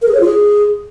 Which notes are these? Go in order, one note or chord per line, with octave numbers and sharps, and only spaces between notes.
A#4
G#4
C#5
F4
G#4